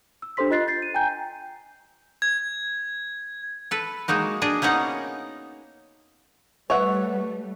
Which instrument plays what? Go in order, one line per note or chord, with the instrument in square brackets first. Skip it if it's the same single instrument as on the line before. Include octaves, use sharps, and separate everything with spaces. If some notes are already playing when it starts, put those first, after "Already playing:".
[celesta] E6
D4 G4 A4 C5 C6 B6
F4 D#5 F#6 A6 C7
G6 A6 C7
D#7
G5 G#5 A#5 G6
[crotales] G#6
[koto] A4 B4
G#3 A#3 D#4 F#4
D4 G#4 D#5
A#3 B3 C#4 D#4 F#5
[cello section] G3 A3 [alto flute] B4 [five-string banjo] C#5 E5 F#5